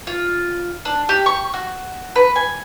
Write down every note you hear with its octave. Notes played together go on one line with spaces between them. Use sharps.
F4
D4
G4
C#6
F#4
B4
G#5